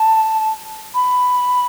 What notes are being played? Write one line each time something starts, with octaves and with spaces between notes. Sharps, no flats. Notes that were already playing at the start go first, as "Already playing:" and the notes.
Already playing: A5
B5